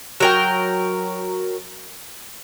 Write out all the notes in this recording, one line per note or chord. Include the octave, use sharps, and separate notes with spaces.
F#3 A#4 G5